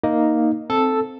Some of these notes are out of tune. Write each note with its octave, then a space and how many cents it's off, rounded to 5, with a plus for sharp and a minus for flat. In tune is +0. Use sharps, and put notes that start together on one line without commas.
A#3 +0 D#4 +0
C4 +0 A4 +0